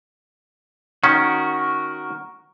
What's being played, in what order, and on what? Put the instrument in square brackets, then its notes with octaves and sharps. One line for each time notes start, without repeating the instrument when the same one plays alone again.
[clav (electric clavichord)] D#3 C#4 [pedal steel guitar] F#4 A#4